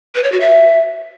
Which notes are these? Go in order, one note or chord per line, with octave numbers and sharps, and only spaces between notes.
B4
C#5
F#4
E5